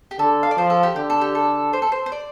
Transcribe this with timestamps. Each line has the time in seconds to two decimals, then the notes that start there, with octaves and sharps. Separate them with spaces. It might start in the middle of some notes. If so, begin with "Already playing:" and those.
0.11 G4
0.19 D3 A4
0.43 F5
0.51 D5
0.57 F3 C5
0.70 A4
0.83 G4
0.96 D3 G4
1.10 A4
1.21 G4
1.35 A4
1.73 C5
1.82 A4
1.92 C5
2.06 C5
2.12 D5